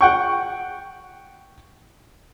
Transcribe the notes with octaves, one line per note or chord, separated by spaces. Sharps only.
F#5 G5 C#6